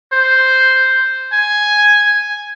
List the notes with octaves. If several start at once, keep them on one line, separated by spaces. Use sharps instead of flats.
C5
G#5